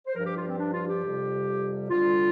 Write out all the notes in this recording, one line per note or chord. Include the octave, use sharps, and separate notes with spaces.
C5
G2 F3 A#4
G4
F4
C4
D4
F4
G4
F2 C3 G3
D2 D3 G3 F4